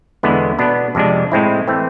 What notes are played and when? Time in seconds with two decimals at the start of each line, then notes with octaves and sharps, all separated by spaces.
0.23 E2 D3 G#3 B3 E4
0.59 B2 B3 D4
0.95 F2 C3 G#3 D4
1.32 A2 G#3 C4 E4
1.68 E3 A3 C4